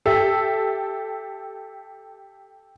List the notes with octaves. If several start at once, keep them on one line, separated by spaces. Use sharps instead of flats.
G4 A4 E5